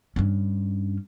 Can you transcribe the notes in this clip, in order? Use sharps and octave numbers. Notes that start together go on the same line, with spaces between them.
G2 C#4